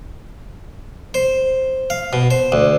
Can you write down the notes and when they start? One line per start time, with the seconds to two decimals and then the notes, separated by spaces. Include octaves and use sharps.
1.14 C5
1.90 F5
2.13 B2
2.31 C5
2.52 D2